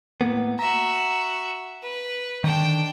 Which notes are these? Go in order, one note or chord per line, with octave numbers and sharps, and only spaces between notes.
A2 A#3 B3
F#4 E5 A#5
B4
D3 D#3 D4 G5